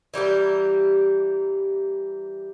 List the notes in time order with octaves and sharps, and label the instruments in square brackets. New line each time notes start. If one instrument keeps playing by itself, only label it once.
[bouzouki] E3 G3 A#3 G4